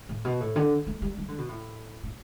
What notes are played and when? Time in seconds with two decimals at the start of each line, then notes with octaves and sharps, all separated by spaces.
0.09 A2
0.25 B2
0.40 A2
0.56 D3
0.87 A3
1.02 G3
1.18 G3
1.28 D3
1.38 B2
1.49 A2
2.03 A2